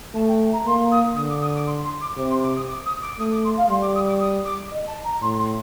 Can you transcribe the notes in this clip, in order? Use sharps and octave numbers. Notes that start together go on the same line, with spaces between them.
A3 A5
G5
A5
A#5
A#3 C6
D#6
D3 D#6
D6
D#6
D6
C6
C6
D6
C3 D6
C6
D6
D#6
D6
D#6
D6
A3 D#6
D6
C6
F5
G3 C6
D6
D#6
D6
D#6
D6
D#5
A5
A#5
A2 C6
C6